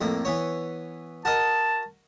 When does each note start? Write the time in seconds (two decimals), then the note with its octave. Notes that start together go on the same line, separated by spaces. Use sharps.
0.01 F2 A2 A#3
0.25 E3 B3 C#5
1.25 F#4 A#4 D#5 A5